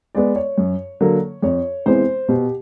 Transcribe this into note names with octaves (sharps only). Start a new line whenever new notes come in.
G#3 B3 D5
C#5
F#2
D3 F#3 A#3
F2 C#5
C3 E3 G#3 B3 C5
B2 G4